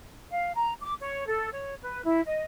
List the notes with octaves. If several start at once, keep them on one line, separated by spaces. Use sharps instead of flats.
F5
A#5
D6
C#5
A4
C#5
B4
E4
D#5